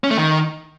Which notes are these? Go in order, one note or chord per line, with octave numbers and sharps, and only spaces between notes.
C#4
A3
D#3